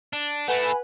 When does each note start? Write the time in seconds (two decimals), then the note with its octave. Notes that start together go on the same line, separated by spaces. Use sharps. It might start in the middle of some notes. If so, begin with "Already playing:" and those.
0.13 D4
0.48 A3 E4 B4 F#5 G#5 B5